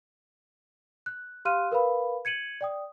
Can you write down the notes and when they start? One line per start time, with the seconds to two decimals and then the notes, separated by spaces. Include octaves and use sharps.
1.06 F#6
1.45 G4 F5 C6 F6 F#6 D#7
1.71 A#4 B4 F5 B5
2.25 G#6 C#7 D#7 F#7
2.61 D5 G5 D#6